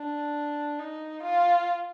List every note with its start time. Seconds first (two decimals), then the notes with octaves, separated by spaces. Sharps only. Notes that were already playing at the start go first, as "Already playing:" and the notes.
Already playing: D4
0.79 D#4
1.23 F4